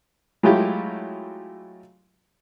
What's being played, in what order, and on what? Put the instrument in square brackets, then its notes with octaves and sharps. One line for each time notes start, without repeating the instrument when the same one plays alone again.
[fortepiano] F#3 G#3 A3 E4 F4 G4